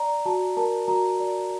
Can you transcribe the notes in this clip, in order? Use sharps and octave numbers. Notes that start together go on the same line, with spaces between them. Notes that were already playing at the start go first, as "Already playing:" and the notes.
Already playing: D5 A#5
F#4 A5
A#4 A5
F#4 A#5
D5